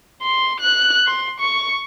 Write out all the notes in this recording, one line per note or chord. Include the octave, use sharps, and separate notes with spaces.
C6
F#6
C6
C#6